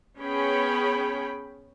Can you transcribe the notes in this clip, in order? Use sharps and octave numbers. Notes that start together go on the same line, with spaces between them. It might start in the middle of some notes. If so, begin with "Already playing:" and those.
B3 C#4 G#4 C#5 G5 B5